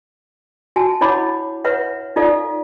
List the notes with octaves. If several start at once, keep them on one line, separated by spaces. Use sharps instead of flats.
F#4 G#5 A5
D4 E4 C#5 F#5 B5 D6
B4 C#5 E5 F#5
D#4 F4 A4 D5 F5